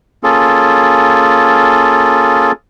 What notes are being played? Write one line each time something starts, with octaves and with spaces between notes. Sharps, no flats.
A#3 C#4 F4 G#4 A4